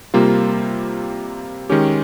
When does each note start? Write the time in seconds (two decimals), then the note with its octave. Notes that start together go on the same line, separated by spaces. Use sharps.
0.14 C3 G3 A#3 F4
1.70 D#3 G#3 C#4 G4